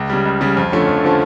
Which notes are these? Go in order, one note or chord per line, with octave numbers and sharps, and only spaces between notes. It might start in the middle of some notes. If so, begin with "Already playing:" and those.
Already playing: C#2
C#3 G3
C#2
C#3 G3
F2
D3 F3 A3 C#4
F2
D3 F3 A3 C#4